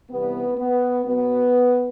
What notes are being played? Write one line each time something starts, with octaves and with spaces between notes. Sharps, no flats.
C3 E3 G3 B3
B3
B2 F#3 B3